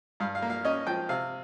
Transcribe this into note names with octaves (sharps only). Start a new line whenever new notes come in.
G2 F5
F5
A#3
F5
C#4 D#5
F3 G5
C3 F5